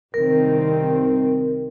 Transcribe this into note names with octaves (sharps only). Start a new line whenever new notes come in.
C2 D#3 C4 A#4